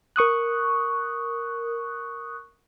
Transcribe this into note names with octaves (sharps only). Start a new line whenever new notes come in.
A#4 C#6 D#6 F#6